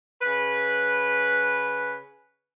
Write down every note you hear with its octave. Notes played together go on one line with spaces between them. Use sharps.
C#3 B4